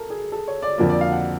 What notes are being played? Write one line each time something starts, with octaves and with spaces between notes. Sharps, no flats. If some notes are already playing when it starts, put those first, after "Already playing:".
Already playing: A4 A#4
G#4
A4
C#5
D5
F2 D3 F3 A#3 D5
D5
F5
F#5